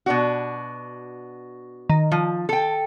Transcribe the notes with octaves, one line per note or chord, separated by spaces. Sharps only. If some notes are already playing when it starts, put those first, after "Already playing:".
B2 D4 F#4
D#3
F3
A4 G5